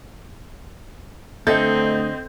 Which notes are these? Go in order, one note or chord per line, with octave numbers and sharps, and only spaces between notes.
D3 A3 C4 A4 D#5 G6